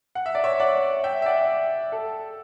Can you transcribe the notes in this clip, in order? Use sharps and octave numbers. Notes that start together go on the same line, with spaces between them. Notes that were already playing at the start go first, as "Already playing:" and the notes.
F#5
E5
D5
C#5 E5
D5 F#5
E5 G5
E5
D5 F#5
A4